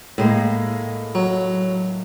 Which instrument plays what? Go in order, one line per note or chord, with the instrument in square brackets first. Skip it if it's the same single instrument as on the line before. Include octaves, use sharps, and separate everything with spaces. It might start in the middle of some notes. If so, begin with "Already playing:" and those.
[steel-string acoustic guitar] A2 G#3 A#3
[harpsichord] F#3